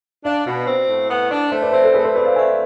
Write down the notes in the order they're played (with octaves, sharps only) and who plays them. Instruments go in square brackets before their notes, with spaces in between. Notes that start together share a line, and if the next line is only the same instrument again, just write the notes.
[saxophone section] D4 [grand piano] D5 F5
[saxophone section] B2
C4
A2
B3
D4
[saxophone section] A3 [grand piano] C5 E5
[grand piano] B4 D5
[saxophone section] C4 [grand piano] A4 C5
[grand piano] A4
[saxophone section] A3 [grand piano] G#4 B4
[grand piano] A4 C5
[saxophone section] C4 [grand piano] B4 D5
[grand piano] D5 F5
[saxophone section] A3 [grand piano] E5 G#5